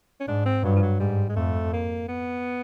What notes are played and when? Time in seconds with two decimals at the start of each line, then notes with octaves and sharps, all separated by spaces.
0.20 C#4
0.28 G#2 D4
0.46 C4
0.64 G2 F#3
0.76 F3
0.82 F#3
1.00 G#2 G3
1.29 G#3
1.36 F2 A3
1.73 A#3
2.08 B3